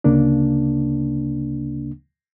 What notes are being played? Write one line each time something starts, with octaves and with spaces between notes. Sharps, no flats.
D2 C#3 A#3 D4